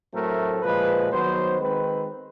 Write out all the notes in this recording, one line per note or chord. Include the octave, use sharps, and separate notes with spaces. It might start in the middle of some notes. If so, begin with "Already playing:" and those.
A2 F#3 A3 C4 A#4
A#2 F3 G#3 B4
D#3 F#3 B3 C5
D#3 G#3 C4 B4